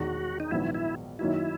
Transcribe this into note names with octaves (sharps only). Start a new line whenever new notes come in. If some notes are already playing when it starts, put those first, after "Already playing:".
Already playing: E1 E2 D#3 G#3 F#4
D#4
A#1 G#2 D#3 F#3 B3 E4
E4
F#2 D#3 A#3 D#4 E4 F#4